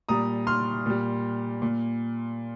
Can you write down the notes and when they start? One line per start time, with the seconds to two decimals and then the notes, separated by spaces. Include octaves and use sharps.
0.09 A#2 G3 A#5 D#6
0.47 C6 F6
0.86 A#2 G3
1.62 A#2